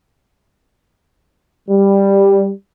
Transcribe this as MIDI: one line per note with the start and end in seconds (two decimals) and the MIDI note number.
1.67 2.50 55